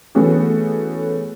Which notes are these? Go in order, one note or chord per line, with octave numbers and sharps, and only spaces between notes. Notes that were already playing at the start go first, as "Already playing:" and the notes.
E3 A3 B3 C#4 F#4 G#4